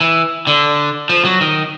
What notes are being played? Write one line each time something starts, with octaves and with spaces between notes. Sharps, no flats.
E3
D3
F3
F#3
D#3